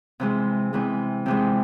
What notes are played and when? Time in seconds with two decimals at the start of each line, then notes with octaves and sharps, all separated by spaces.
0.20 C3 E3 G#3
0.73 C3 E3 G#3
1.26 C3 E3 G#3